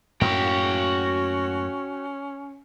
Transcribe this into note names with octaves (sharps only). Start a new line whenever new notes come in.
F#2 A2 A#3 C#4 F#4 G5